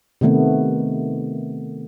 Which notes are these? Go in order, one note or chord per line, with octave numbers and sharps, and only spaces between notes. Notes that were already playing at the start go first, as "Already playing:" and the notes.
C3 D#3 A3 B3